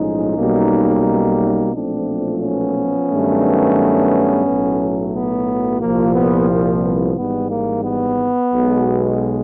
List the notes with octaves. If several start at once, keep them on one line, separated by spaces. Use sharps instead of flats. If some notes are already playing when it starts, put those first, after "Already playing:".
Already playing: B1 A2 F3 G#3 C#4 D#4
B1 B2 G3 A#3
B1 A#2 F3 A3 C4 D4
B3 C#4
G2 D#3 F#3 A3
B1 A2 F#3 A3
B3
C2 A#2 F3 A#3
B3
A#3
B3
G#1 G#2 E3 G3 B3
A#3
B3
B1 B2 G#3